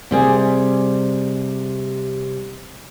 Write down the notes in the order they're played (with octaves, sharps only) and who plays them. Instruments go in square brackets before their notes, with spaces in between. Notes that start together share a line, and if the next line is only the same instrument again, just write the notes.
[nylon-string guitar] C3 G3 G#4